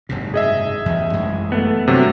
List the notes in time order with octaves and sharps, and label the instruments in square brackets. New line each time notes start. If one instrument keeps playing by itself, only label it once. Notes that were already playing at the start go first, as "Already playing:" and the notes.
[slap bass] F#1 G#2 C3
[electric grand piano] G#4 D#5 E5
[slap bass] E2 C#3
A1 F#2 G#3
[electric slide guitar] A3 B3
[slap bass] G2 [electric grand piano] C3 F#3